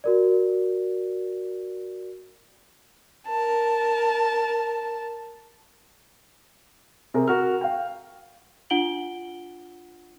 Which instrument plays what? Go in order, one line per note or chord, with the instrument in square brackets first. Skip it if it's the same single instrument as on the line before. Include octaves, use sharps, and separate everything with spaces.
[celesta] F#4 A#4 D5
[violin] A#4 A5
[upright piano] C3 C4 G#4 A#4
F#4 A#4 F6
F5 G5
[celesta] D4 F4 F#5 D7 F#7 G7